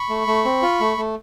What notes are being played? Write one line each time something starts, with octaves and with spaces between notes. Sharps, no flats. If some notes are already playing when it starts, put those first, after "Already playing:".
Already playing: B5 C#6
A3
A3
C4
F4
A3
A3